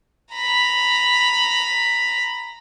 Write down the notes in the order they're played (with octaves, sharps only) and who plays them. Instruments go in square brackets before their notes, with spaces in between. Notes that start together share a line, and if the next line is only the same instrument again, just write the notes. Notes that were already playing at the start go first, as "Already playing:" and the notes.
[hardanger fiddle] A#5 B5